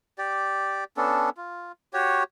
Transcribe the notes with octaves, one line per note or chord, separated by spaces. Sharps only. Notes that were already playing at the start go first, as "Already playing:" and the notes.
G4 D5
B3 C#4 D4 A4
F4
F#4 G4 C#5